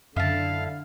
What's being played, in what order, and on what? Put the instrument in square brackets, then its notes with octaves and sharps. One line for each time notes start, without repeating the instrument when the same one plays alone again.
[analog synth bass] F#2 [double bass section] D3 [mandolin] E4 A5 [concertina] F5